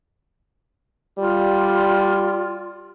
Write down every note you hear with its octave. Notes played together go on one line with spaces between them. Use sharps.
G3 F4